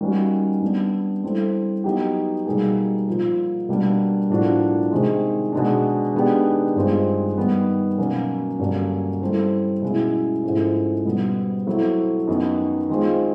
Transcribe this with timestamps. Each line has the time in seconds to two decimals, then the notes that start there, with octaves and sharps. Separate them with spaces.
0.01 D#3 G3 A#3 C#4 F#4
0.62 G3 B3 D4
1.24 G3 C4 E4 A4
1.84 F#3 B3 D#4 G4
2.46 B2 G3 A#3 D#4 G#4
3.08 A#2 F3 A#3
3.69 B2 G3 A#3 D4
4.30 A2 F3 A#3 D4 F#4
4.92 C3 D#3 G#3
5.52 B2 G#3 B3 D4
6.14 D#3 G#3 B3 D4 G4
6.76 G2 D#3 G#3 C4 F4
7.38 D#3 G3 B3
7.98 B2 F#3 A#3 C#4
8.59 G2 D3 F#3 A#3 C#4
9.22 G3 C4 E4 A4 C5
9.82 B2 G#3 C#4 E4
10.44 G#2 F3 A3 C#4 E4
11.05 B2 G3 B3
11.67 F#3 A3 C4 E4
12.27 F#2 D#3 F#3 B3 D#4
12.89 D#3 G#3 C4 F4